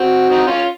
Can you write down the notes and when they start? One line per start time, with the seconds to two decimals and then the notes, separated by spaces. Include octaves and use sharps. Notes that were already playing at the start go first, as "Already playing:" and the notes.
Already playing: C4 F#4
0.30 C4 D#4
0.47 C#4 F4